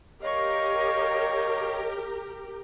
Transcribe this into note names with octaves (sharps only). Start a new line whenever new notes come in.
G4 A#4 C#5 D#5 F5 C#6